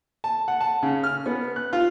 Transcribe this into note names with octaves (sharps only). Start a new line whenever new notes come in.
A5
F#5
A5
C#3
F6
B3
F#6
F4